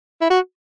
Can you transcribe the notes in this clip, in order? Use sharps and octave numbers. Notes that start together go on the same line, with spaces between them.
E4
F#4